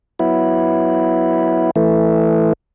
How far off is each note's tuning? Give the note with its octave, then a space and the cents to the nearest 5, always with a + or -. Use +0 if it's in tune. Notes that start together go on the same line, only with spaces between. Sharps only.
F#3 +0 B3 +0 E4 -5
E3 +0 A3 +0